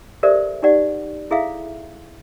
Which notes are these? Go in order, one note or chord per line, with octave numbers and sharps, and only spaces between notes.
G4 A4 A#4 C5 D5 E5
D#4 G4 D5 F#5
E4 G#4 A4 E5 F5